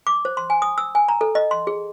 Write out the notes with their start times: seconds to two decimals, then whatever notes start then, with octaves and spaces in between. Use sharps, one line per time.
0.07 D6
0.25 C5
0.37 C6
0.50 G#5
0.62 D#6
0.78 E6
0.95 G#5
1.08 A#5
1.21 A4
1.35 D#5
1.51 C6
1.67 G#4